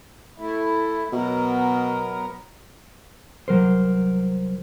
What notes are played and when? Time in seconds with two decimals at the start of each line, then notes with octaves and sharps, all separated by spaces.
0.38 A3 E4
1.12 B2 F#3 B3 A#4
3.48 C2 F#3 A#4 C5